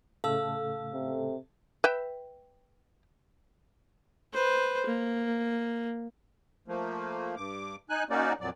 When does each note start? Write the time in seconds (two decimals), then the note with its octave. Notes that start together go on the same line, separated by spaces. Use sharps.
0.24 A2 C#3 A3 A4 F5 E6
0.93 C3
1.84 B4 E5 G5
4.34 B4 C5
4.86 A#3
6.68 F3 A3 A#3
7.37 G2 D6
7.90 D#4 G#5 F#6
8.10 A#3 C#4 D#4 F#4 D5
8.41 F2 A#2 F#3 D5